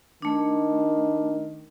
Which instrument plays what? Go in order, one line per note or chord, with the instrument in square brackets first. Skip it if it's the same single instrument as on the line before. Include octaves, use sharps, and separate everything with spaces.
[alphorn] D#3 [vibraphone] A3 D4